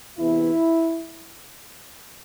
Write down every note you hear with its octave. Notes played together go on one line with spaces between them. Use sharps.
E2 C3 E3 B3 E4